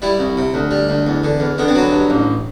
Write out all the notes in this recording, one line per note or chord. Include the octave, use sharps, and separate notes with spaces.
G3 E4
C2
C3
D2
G3
D2
E2
D3
E2
D3 B3
C4
F#3 B3
G2
A1